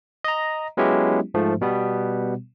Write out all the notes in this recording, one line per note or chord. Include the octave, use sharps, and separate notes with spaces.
D#5 A#5
F#3 G#3 B3 C#4 E4 G4
G#2 F3 A3
B2 G3 B3